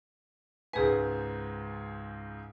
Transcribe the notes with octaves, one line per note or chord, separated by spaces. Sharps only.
C#2 G#2 G#4 B4 G#5